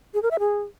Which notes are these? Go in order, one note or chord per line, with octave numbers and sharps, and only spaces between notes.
G#4
A#4
E5
G#4